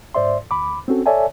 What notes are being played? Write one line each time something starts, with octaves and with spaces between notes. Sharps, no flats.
G#2 C5 D5 E5 C6
D2 B5 D6
C4 C#4 F#4 A4
A4 C#5 D5 E5 G#5 A5